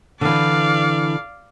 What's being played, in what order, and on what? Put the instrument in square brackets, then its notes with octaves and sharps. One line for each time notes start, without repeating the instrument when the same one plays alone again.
[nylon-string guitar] D3 E3 [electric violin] D5 F5